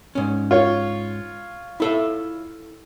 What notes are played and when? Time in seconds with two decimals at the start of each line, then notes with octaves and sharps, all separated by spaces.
0.15 G#2 C#4
0.51 F4 C#5
1.80 E4 A4 E5